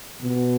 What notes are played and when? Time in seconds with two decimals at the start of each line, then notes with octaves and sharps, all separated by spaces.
0.22 B2